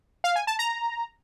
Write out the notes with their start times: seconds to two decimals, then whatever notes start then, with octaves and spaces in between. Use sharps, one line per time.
0.24 F5
0.36 G#5
0.47 A5
0.59 A#5